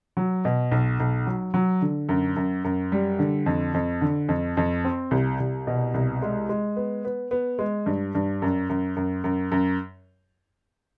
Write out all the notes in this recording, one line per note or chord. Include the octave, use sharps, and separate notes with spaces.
F#3
B2
B1
B1
F#3
F#3
D3
F#2
F#2
F#2
G3
D3
F2
F2
D3
F2
F2
C4
C2
C2
B2
C2
G#3
G#3
B3
B3
B3
G#3
G2
G2
F#2
F#2
F#2
F#2
F#2